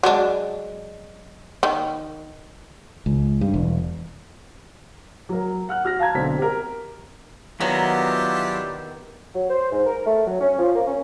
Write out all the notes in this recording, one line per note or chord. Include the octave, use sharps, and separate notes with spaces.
F#3 G#3 D4
D#3
C#2
G2
E1
F#3 A#4
F#5 F6 F#6
F#4 F6 A#6
F5 A5 A#5 G#6
B1 D3 C4 B6
G4 A#4
D#3 F#3 B3 D4 E4 F4 G4 A#4
F#3
C5
G#2
A#4
A3
F#3
C#4
F3
A#3
C#4